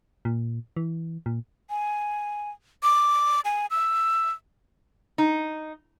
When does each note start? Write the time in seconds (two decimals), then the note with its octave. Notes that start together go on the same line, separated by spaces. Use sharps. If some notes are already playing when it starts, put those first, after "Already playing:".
0.25 A#2
0.76 E3
1.26 A#2
1.70 G#5
2.83 D6
3.45 G#5
3.71 E6
5.18 D#4